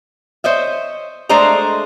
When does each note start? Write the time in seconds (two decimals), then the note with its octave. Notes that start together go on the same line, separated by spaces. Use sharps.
0.44 C5 C#5 D#5 E5
1.29 G#3 A3 D4 C5 D#5 A#5